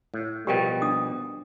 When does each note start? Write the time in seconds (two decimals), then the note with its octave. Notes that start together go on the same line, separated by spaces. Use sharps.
0.14 A2
0.47 B2 F3 G3 G4 A#4 G5
0.82 D4 D#6